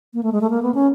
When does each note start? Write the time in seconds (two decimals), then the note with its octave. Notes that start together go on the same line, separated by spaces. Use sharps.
0.14 A#3
0.23 A3
0.32 G#3
0.41 A3
0.50 A#3
0.63 B3
0.74 C#4